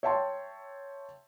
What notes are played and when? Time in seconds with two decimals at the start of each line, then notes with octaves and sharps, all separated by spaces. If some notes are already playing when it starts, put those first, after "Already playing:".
0.03 C#5 E5 G5 A5 C6